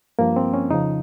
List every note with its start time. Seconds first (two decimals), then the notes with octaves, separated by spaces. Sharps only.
0.19 G2 F3 A#3
0.36 C4
0.54 C#4
0.70 F2 C#3 F3 D#4